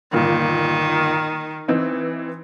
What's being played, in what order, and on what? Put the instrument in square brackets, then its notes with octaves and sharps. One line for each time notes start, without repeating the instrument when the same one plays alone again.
[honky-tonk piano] G1 A#2 [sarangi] D#3
[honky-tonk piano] E3 C4 D#4